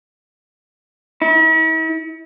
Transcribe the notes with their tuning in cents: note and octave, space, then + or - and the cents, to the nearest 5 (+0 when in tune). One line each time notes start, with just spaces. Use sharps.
E4 -45